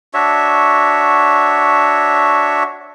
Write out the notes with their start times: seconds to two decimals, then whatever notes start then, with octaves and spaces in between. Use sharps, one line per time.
0.14 D4 F#4 C#5 E5